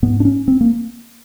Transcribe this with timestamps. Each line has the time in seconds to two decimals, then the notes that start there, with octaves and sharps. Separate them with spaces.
0.02 G#2 B3
0.20 D4
0.25 C#4
0.48 C4
0.61 A#3